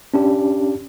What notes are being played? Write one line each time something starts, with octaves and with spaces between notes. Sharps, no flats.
C#4 D4 G4